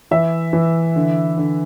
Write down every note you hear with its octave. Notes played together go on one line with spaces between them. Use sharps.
E3 E5
E3
D3
D3